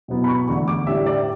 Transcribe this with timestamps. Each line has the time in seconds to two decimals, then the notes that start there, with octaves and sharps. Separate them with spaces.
0.08 B2 F#3 B3 E4
0.24 B5
0.28 C#6
0.48 E2 D3 A3 D4 C#6
0.68 D6
0.87 A2 G3 D4 E5
1.06 D5